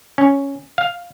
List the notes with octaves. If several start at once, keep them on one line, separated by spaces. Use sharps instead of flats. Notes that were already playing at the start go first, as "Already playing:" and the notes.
C#4
F5